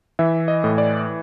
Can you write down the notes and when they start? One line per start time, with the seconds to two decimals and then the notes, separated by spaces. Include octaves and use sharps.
0.19 E3 E5
0.48 D#5
0.64 A2
0.78 D5